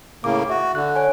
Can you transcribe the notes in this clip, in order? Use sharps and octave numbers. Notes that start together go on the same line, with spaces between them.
A2 C#3 A#3 D6
F#4 E5
D3 F#6
C#5 G#5